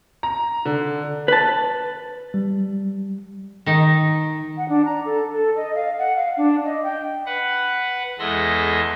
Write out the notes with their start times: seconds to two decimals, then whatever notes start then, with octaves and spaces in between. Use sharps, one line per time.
0.23 A#5
0.66 D3
1.28 B4 A5
2.34 G3
3.66 D#3 D#4
4.57 F#5
4.69 D4
4.85 A#5
5.05 A4
5.33 A4
5.56 D#5
5.75 F5
5.98 F#5
6.16 F5
6.37 D4
6.65 D#5
6.83 G5
7.26 B4 F#5
8.19 E2 G#3 A4 E5 C6 A#6